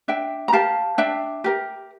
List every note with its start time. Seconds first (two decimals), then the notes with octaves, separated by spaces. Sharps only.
0.08 D4 E5 G5
0.48 A#5
0.53 G4 A#4 F5 A5
0.98 D4 E5 G5
1.44 G4 A#4